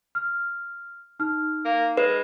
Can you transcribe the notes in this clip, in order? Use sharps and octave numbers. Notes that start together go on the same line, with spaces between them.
F6
D#4 F6
A#3
G#3 B4